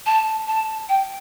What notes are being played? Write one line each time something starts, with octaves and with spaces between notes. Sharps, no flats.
A5
A5
G5